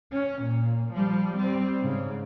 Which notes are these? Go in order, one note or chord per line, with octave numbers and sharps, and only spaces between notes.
C#4
A#2
F3 G3
G3 C4
G#2 C#3